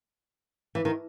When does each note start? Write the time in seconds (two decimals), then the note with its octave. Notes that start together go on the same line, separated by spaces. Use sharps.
0.75 E3
0.85 D#3